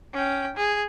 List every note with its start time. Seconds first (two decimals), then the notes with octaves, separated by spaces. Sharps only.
0.13 C#4 G5
0.57 G#4